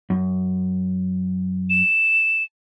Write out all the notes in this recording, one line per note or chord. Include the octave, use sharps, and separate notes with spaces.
F#2
E7